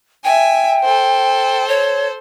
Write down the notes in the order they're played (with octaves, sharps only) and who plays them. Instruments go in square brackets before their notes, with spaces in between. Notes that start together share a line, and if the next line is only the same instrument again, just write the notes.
[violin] E5 G#5 [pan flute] G5
[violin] A4 C5
[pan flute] C#5